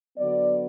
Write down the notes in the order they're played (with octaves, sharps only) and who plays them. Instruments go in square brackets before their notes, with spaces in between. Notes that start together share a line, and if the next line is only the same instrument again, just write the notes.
[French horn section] D3 F#3 B3 D5